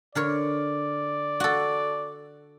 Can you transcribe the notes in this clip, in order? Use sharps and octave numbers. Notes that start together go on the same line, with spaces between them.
D3 A#4 C#5 D5
F#4 A4